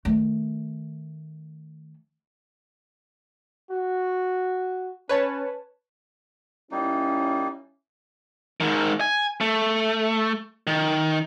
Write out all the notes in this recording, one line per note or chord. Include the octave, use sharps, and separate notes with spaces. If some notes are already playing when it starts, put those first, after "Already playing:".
D#3 A3
F#4
C#4 B4 C#5 A5
G3 A#3 C#4 D#4 E4
G#2 D#3
G#5
A3
D#3